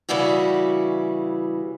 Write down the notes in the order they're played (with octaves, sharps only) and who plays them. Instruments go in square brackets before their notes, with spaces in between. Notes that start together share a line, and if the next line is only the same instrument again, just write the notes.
[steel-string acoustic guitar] C#3 E3 G3 E4 F#4